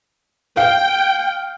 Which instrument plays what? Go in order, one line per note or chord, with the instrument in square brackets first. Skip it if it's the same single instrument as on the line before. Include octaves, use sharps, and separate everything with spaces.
[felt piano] F5 [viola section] G5